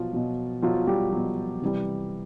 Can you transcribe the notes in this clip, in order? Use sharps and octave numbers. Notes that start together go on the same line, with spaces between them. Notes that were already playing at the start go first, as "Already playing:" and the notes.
Already playing: B2 F3 F#3 F4
B2 F#3
B2 F3 F#3 F4
G3 G4
B2 F#3
C3 E3 G3